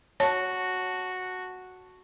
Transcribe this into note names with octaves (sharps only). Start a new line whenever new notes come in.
F#4 C#5 A5